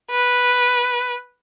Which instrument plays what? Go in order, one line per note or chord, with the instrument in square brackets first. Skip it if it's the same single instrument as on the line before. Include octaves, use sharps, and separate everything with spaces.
[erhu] B4